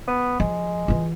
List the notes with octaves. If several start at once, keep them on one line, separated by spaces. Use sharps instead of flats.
B3
F3 G#3
E3 F4